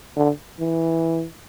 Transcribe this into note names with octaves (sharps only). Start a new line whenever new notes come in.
D3
E3